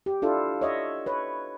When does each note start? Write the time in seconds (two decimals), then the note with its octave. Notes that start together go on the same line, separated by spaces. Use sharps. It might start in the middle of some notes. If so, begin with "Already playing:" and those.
0.06 G4
0.22 D4 E4 F4 A4
0.61 C#5 D#5 E5
1.06 B4 C#5